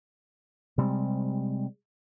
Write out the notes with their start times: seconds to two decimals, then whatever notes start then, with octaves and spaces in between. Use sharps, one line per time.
0.78 C3 G3 G#3 C4